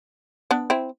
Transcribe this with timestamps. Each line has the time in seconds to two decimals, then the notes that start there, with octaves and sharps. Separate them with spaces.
0.51 B3 D4
0.70 C4 E4